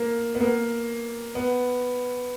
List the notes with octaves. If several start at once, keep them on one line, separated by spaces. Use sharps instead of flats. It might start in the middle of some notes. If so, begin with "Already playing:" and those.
Already playing: A#3
B3
A#3
B3